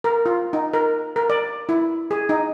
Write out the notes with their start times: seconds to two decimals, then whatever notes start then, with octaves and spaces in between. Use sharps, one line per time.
0.04 A#4
0.26 F4
0.53 D#4
0.73 A#4
1.16 A#4
1.30 D5
1.69 E4
2.11 G#4
2.29 D#4